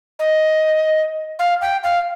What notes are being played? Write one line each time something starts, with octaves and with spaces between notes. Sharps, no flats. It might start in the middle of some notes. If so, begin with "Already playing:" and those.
D#5
F5
G5
F5